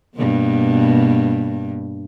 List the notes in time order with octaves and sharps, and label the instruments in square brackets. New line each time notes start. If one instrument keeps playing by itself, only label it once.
[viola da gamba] G2 B2 A#3